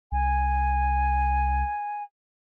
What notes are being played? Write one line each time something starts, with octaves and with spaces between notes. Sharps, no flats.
C2 G#5